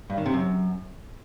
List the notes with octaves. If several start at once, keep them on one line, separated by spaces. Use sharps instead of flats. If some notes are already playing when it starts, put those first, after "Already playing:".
G2
D#3
C3
F#2